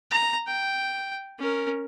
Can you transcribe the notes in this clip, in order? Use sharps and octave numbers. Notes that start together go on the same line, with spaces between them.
A#5
G5
C#4 A#4